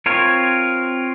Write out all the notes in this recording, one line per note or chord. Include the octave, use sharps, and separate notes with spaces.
C4 F4 A#4 C#5